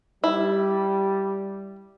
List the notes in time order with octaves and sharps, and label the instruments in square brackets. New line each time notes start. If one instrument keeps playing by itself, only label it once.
[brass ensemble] G3 [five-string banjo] E4